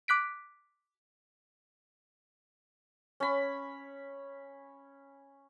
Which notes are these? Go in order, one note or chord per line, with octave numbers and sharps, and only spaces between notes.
D6 F#6 B6 D7
C#4 B5